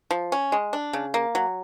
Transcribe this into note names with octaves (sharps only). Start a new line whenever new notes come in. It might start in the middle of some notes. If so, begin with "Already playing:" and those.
F3
C#4
G#3
D4
C#3
A#3
F#3